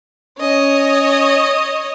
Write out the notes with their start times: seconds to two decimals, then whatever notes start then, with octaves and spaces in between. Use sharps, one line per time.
0.40 C#4 C#5 D#5